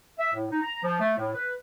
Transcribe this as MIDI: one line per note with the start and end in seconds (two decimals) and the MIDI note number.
0.19 0.33 76
0.34 0.45 45
0.51 0.61 63
0.63 0.81 82
0.83 0.97 53
1.00 1.14 57
1.17 1.31 45
1.35 1.54 71